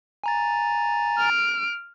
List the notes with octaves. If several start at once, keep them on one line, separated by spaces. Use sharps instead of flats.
G#5 A#5 A6
F6 D7